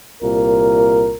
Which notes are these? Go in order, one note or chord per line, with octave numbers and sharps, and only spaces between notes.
C2 A#2 A#4